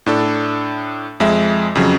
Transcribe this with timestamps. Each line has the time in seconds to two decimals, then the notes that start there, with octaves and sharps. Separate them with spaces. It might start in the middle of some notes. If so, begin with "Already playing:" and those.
0.06 A2 D4 A4
1.20 F2 G#3 E5
1.75 F2 C#3 F#3